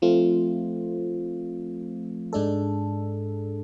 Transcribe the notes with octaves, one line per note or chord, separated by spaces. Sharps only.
F3 A3 C4 F4
G#2 G#3 D4 A4